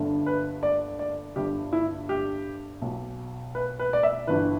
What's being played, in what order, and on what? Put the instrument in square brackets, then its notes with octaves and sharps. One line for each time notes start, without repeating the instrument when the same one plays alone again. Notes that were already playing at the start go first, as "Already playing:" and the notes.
Already playing: [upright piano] G1 G2 D3
B4
D5
D5
G1 G2 D3 G4
E4
G4
B1 B2
B4
B4
D5
E5
G1 G2 E3 B4